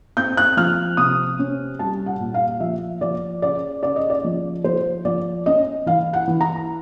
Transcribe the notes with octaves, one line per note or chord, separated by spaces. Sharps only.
C4 G6
F#6
F3 F6
C3 D#6
C#4
G3 A5
F#5
A#2
F5
F3 E5
F3 D5
C#3 D5
C#3 D5
D#5
D5
F3
F3 C5
F3 D5
C#4 D#5
E3 F5
F#5
E3
A#5